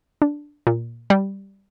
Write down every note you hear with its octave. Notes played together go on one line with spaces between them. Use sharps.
D4
A#2
G3